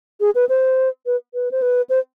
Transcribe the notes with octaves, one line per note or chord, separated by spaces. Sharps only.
G#4
B4
C5
B4
B4
C5
B4
C5